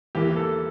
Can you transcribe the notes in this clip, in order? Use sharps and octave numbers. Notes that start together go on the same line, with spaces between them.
E2 E3 A#3 G4
A4